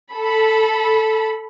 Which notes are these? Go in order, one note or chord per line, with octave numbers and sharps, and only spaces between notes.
A4 B5